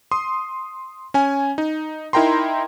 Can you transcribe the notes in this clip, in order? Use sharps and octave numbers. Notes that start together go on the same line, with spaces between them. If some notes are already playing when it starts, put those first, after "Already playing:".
C6 D#6
C#4 G#5
D#4
D#4 E4 A#4 G5 A#5 C6